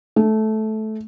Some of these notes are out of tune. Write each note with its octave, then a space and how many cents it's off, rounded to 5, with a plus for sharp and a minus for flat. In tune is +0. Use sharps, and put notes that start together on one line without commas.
A3 -15